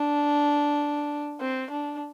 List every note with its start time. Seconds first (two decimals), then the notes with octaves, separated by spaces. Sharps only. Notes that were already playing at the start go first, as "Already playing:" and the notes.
Already playing: D4
1.40 C4
1.71 D4